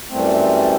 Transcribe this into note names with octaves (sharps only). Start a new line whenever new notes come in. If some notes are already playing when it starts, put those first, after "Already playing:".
F#2 E3 G3 A3 C4